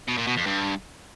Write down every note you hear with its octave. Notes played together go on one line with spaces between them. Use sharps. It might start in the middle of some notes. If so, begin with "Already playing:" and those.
B2
A#2
B2
F2
G2